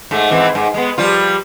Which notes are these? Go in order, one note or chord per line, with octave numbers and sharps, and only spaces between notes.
G#2 A3
G#2 E3 C4
G#2
G#3 B3
F3 G3 F4